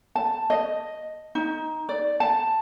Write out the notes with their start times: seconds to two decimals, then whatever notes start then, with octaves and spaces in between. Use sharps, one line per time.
0.15 A5
0.50 D#5
1.35 D#4
1.89 D5
2.20 A5